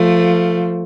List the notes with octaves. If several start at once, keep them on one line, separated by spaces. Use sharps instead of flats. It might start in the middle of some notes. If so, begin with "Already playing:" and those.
Already playing: F3 A3